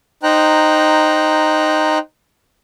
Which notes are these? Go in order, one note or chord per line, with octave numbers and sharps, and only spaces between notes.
D#4 C5 G5 A#5 F#6